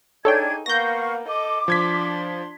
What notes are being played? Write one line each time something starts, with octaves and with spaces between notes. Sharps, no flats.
D4 D#4 G#4 A4 C#5 G5 G#6
A#3 B3 F5 C#6 G6 A#6
A4 D#5 D6
F3 D4 C6 G#6 B6